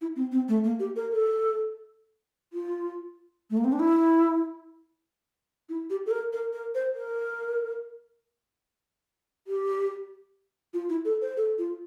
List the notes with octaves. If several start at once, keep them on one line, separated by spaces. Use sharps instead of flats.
E4
C4
C4
A3
A#3
G4
A#4
A4
F4
A3
A#3
C4
D4
E4
E4
G4
A4
A#4
A#4
A#4
C5
A#4
G4
F4
E4
A4
C5
A4
F4